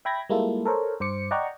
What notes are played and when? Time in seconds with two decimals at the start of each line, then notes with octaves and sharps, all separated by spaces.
0.05 E5 G5 B5 G#6 A#6
0.29 G3 G#3 A#3 E4 F4 A4
0.65 A4 A#4 C5 C#5
1.00 G2 C5 D6 C#7
1.31 D5 D#5 F#5 G5 A#5 C#6